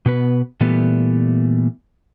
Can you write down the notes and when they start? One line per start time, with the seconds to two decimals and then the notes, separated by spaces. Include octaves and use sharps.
0.06 B2 B3 B4
0.60 A#2 E3 G3 A3 B3